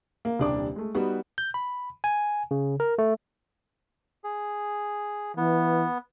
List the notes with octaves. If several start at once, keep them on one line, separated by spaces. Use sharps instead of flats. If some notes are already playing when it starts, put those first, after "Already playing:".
A#3
D#1 C2 D4 D5 D6
G#3 A3
G3 B3 D#4 F#4
G6
B5
G#5
C#3
A#4
A3
G#4
E3 B3